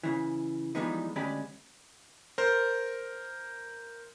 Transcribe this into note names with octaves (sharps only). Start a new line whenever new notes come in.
C#3 E3
E3 F3 G3 G#3 B3 D#4
D2 G#3 C#4 G4 D5 B5
A#4 C5